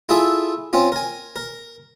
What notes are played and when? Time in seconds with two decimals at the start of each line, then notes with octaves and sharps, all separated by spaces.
0.09 E4 F4 G#4 A4 E5
0.73 C4 C#4 F4
0.92 A#4 G#5
1.36 A#4